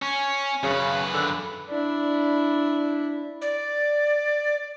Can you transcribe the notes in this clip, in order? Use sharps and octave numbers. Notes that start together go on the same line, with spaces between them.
C#4
F#2 C#3 B4
D3
D4 E4
D5